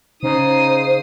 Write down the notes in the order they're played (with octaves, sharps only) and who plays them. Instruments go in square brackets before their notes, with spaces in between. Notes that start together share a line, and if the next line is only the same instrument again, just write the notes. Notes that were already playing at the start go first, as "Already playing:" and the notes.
[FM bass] C#3 [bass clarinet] D#4 [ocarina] C5 [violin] D#6 C7